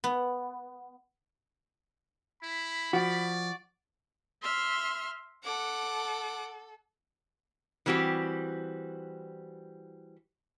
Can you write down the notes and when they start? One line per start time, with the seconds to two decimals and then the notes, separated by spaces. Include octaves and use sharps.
0.04 B3
2.43 E4 B5
2.93 F3 F#4 D5
4.42 E5 C6 F6
5.44 A4 F#5 D6
7.86 E3 G3 C4 F#4 G4